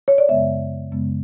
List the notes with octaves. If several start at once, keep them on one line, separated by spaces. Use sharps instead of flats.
C#5
D5
F#2 C#3 G#3 B3 E5
F#2 C#3 G#3 B3